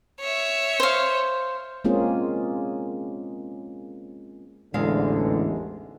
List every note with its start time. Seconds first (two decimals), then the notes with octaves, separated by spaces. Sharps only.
0.20 C#5 E5
0.80 C5 F5
1.84 G#3 A#3 C4 C#4 F4 G#4
4.74 A1 E2 G#2 D3 G#3 F5